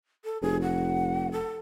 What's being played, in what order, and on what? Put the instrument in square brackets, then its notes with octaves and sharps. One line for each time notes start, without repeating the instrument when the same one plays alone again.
[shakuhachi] A4
[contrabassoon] F1 [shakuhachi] G#4
[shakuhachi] F#5
A4